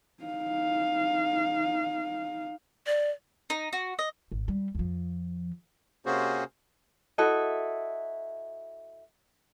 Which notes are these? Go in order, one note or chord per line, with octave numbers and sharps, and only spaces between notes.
D#4 F5
D5
D#4
F#4
D#5
G#1
G3
F2 F3
C3 A#3 C#4 F#4 G#4 C5
E4 F#4 A4 D#5